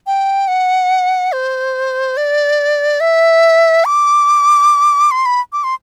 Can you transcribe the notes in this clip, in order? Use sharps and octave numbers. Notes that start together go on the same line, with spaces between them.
G5
F#5
C5
D5
E5
D6
C6
B5
D6
C6